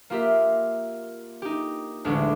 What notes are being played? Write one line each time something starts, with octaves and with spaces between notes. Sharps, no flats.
A#3 F4 G4 A#4 E5
D#4 G4
A1 D2 G#3 D4 C#6 D6